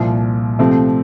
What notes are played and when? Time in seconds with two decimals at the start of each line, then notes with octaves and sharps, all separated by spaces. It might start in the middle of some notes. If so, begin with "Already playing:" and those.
Already playing: C2 A#2 F3
0.59 C3 F3 A3 C4